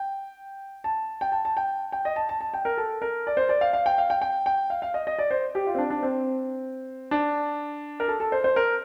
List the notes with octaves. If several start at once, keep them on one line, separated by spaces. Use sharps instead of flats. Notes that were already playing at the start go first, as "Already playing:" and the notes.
Already playing: G5
A5
G5
A5
A5
G5
G5
D#5
A5
A5
A5
G5
A#4
A4
A#4
D5
C5
D5
F5
F5
G5
F5
G5
G5
G5
F5
F5
D#5
D#5
D5
C5
G4
F4
C4
D4
D4
C4
D4
A#4
A4
A4
C5
C5
A#4